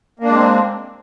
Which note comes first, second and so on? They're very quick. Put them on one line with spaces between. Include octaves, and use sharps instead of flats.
A#3 D4 G#3 C4